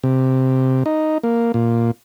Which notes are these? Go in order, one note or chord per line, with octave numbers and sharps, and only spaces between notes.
C3
D#4
A#3
A#2